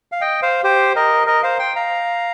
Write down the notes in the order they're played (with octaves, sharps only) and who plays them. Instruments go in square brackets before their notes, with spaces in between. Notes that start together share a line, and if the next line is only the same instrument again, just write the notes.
[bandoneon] F5
D#5 G5
C5 F5
G4 C5
A#4 D#5
A#4 D#5
C5 F5
G5 C6
F5 A#5